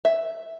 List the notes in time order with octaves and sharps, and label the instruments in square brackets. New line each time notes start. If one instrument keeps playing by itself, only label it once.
[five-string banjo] E5